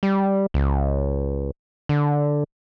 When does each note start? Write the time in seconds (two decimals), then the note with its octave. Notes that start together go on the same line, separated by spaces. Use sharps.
0.03 G3
0.54 C#2
1.89 D3